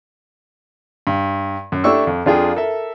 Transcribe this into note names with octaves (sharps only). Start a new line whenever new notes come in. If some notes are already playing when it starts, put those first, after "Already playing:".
G2
F#2
A3 D4 E4 G4 C#6 E6
F2
F2 D4 F4 G#4 G5
A4 A#4 E5